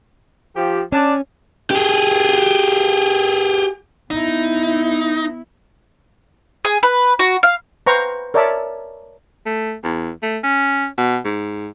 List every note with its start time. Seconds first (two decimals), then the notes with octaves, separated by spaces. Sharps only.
0.55 F3 G4
0.92 C#4 D4
1.71 G4 G#4
4.11 B3 D#4 E4
6.65 G#4
6.83 B4
7.19 F#4
7.43 F5
7.86 B4 C5 F5 G5 A#5 C#6
8.34 A#4 C#5 D5 E5 A5
9.46 A3
9.84 E2
10.23 A3
10.43 C#4
10.98 B2
11.25 G#2